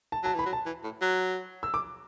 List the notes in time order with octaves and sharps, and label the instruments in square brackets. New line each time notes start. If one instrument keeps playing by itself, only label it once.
[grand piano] A5
[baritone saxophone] F#3 [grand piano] A5
[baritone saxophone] E3 [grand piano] B5
[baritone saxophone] F#3
[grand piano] A5
[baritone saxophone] E3
A2
F#3
[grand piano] E6
D6